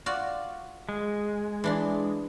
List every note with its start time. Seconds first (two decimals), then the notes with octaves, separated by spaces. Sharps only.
0.06 F4 F#4 D5
0.89 G#3
1.64 E3 D4 C6